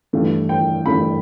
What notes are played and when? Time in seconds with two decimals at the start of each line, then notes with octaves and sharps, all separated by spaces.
0.13 G2 E3 A3
0.49 G5
0.86 G2 E3 A3 B5